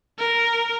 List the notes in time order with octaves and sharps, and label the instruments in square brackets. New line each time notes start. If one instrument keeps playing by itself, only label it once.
[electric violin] A#4